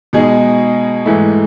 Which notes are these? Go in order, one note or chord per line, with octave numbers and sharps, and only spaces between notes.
B2 G#3 D#4 G#4
G#2 E3 A3 E4